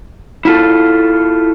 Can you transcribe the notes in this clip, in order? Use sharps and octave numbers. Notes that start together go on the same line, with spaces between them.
E4 F4 A4